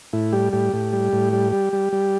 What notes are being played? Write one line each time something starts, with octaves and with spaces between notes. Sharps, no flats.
A2 E4
G3 G4
A2 G4
A2
G3
A2
G3
G3
G3
G3